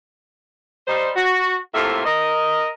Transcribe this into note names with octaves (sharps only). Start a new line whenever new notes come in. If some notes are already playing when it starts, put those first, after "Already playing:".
G3 D#4 C5
F#4
A2 C3 A#3 F4 A4 E5
A#4 D#5